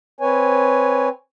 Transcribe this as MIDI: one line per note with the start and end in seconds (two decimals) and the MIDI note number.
0.20 1.09 60
0.20 1.09 71
0.20 1.09 73
0.20 1.09 80